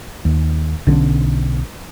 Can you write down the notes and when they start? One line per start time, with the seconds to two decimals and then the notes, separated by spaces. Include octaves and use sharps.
0.25 D#2
0.87 B1 D3 C#4